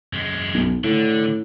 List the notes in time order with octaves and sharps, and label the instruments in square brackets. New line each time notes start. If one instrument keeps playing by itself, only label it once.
[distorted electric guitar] F#2 G#3
[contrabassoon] B1
[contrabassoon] A2 [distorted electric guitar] D3